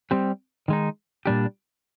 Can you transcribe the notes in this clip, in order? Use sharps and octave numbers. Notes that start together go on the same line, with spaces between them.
G3 C4 G4
D#3 G#3 D#4
A#2 G3 D4 G4